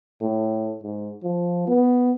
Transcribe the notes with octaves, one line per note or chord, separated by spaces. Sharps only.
A2
G#2
F3
B3